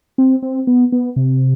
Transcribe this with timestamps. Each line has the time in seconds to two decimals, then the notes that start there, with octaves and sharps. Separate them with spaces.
0.18 C4
0.43 C4
0.67 B3
0.92 B3
1.16 C3